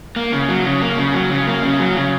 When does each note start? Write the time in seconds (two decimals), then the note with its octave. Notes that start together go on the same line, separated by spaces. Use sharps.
0.16 A#3
0.32 C#3
0.49 F#3
0.64 C#3
0.82 A#3
0.98 C#3
1.14 F#3
1.30 C#3
1.47 A#3
1.63 C#3
1.79 F#3
1.96 C#3